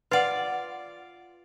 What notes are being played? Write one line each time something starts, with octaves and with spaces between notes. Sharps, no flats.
F4 B4 D5 F#5